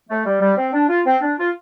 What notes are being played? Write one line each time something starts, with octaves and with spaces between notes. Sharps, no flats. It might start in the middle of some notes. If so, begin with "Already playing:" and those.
A3
G3
G3
C4
D4
F4
C4
D4
F4